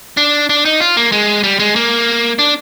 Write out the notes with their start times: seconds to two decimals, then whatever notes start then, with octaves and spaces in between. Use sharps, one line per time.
0.17 D4
0.49 D4
0.65 D#4
0.80 F4
0.97 A#3
1.12 G#3
1.43 G3
1.59 G#3
1.76 A#3
2.39 D4